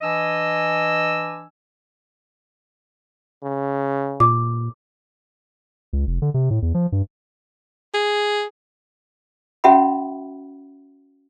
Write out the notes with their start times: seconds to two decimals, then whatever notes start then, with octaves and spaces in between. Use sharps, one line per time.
0.02 E3 D4 D#5 G#5 E6
3.43 C#3
4.20 A#2 D6
5.93 C#2
6.07 F1
6.22 D3
6.34 C3
6.51 A2
6.62 E2
6.74 F3
6.92 G2
7.94 G#4
9.64 C#4 F#4 E5 F#5 B5